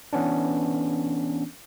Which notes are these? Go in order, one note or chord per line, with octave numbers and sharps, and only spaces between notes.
E3 B3 C#4 D4